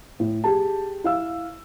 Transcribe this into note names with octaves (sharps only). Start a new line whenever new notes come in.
A2
G4 G#4 A5
E4 F5 E6